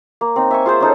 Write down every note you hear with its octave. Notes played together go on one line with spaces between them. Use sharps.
A#3
C4 D#4
E5 G#5 C#6
F4 G#4 C5 E5
C#4 D#4 A4